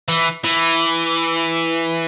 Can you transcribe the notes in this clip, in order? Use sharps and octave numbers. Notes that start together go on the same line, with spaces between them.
E3
E3